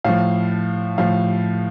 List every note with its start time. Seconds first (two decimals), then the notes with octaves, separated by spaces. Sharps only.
0.04 A2 F3 F5
0.98 A2 F3 F5